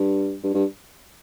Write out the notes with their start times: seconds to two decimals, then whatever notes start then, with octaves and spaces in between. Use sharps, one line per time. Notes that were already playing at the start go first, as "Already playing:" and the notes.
Already playing: G2
0.43 G2
0.54 G2